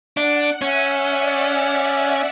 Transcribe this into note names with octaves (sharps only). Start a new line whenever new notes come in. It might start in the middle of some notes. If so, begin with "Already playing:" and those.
D4 F#5
C#4 E5
D5